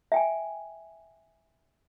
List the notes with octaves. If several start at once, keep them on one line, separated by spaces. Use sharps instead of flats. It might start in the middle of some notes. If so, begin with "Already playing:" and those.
E5 G5 G#5